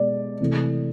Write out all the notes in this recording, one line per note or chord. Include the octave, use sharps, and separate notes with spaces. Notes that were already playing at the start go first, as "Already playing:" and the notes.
Already playing: B2 G#3 D5
C3 E3 A3